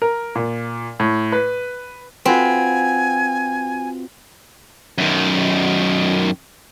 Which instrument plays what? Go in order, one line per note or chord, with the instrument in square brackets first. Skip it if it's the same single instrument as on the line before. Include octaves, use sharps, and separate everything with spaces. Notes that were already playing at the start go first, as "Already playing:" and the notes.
[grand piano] A#4
A#2
A2
B4
[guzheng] C4 [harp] F4 F#4 B4 [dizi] G#5
[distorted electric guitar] F#2 D#3